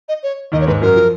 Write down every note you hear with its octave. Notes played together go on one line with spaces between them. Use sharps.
D#5
C#5
D#2 D#3 D#5
C#5
G#2 G#3 B4
F#2 F#3 A#4
F3